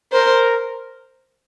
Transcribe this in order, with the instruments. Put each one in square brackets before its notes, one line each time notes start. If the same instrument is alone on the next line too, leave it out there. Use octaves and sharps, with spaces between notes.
[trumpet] A#4 [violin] C5